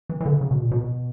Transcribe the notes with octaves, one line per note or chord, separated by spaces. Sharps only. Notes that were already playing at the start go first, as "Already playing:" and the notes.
E3
E3
D3
C#3
B2
A#2
B2